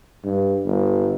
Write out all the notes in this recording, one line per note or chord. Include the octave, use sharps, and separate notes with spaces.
G2
G1